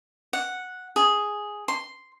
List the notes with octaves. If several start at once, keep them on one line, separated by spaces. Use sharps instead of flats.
F#5
G#4
C6